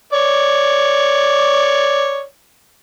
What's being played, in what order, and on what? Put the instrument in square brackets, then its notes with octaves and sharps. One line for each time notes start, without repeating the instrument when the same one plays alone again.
[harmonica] C#5 D5